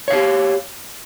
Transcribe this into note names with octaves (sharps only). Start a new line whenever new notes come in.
G4 C#5 F5